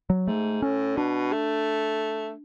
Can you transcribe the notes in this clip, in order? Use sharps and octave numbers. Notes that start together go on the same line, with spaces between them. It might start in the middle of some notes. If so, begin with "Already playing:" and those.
F#3
G#2 A3
A2 C#4
B2 D4
A3